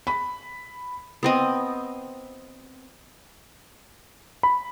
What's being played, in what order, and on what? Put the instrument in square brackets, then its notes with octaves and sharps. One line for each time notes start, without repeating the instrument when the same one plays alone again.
[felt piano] B5
[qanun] B3 C4 D#5
[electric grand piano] B5